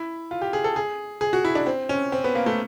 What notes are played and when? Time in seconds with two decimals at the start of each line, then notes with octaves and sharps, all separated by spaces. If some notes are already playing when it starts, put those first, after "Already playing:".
Already playing: E4
0.31 F4
0.42 G4
0.53 G#4
0.64 A4
0.76 G#4
1.21 G#4
1.33 F#4
1.45 E4
1.55 D4
1.66 C4
1.89 C#4
2.12 C4
2.24 B3
2.35 A#3
2.46 A3